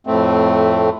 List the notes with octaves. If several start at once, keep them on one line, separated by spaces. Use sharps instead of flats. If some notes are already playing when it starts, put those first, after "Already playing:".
F2 A2 A3 C4